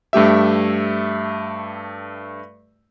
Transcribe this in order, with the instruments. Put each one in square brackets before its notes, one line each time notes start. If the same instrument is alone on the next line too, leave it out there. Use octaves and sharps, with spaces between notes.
[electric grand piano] G2 A3 G4 E5